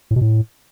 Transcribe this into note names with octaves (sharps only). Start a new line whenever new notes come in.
A2
B2
A2